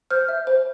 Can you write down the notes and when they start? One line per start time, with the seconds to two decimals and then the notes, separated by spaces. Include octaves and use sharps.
0.11 C5 F6 G6
0.28 E5
0.47 C5